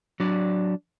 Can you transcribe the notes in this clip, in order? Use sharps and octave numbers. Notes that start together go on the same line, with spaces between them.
F#3 D4 D5